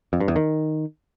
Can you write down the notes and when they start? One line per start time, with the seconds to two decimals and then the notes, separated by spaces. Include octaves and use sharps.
0.13 F2
0.20 G2
0.28 E2
0.36 D#3